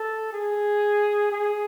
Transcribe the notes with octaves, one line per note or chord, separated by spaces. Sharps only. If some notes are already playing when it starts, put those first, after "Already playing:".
Already playing: A4
G#4
G#4